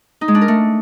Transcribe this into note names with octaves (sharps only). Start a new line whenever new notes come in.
D#4
G#3
D4
A#4
A3